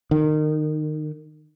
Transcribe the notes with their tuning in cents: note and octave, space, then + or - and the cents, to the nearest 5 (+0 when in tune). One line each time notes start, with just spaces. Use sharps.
D#3 -25